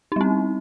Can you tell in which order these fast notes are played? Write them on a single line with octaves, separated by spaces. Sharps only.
D#4 G3 C4